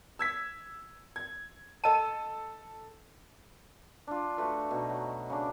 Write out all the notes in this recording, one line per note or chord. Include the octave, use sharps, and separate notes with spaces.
E6 G#6 B6
G#6
A4 D#5 A5 E6 D#7
D4 F4
A3 F#4 A4 B4
B2 D#4
F#3
C#3 D4